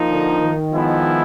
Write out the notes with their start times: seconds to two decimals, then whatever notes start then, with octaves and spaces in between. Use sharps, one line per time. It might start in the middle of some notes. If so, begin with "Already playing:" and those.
Already playing: F3 A#3 D#4
0.09 D3
0.41 D#3
0.71 F3 G#3 B3 E4